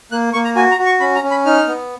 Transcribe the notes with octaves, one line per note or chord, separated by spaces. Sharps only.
A#3 F#6
A#3 C#6
A#5
F#4 G#5
A#5
F#4
C#6
C#4 B5
A#5
C#4
B5
D#4 F6
B3